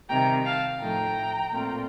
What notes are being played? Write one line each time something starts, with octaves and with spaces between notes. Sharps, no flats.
C3 D#3 G3 G5 A#5
F5 A5
A2 F3 A3 D#4 G5 A#5
A#2 A3 C4 F4